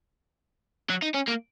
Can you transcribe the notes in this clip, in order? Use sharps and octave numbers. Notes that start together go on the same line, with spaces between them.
F#3
D#4
C#4
A#3